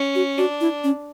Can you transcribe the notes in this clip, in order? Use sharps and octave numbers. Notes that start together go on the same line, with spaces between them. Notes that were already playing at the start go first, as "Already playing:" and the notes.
Already playing: C#4
F#4
D4 F#4
E4
C#4